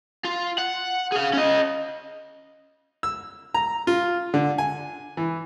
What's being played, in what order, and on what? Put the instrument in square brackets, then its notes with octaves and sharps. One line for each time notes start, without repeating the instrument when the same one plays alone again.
[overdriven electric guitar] F4
F#5
G#4 F5
C#4 D#5
[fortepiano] E6
A#5
F4
D3
G#5
E3